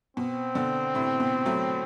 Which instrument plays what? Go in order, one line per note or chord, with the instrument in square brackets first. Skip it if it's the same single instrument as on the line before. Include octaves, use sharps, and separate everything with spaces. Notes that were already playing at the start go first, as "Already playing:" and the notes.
[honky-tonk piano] B2 [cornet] C4
[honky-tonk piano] B2 D3
A2 C3
B2
F#3 A3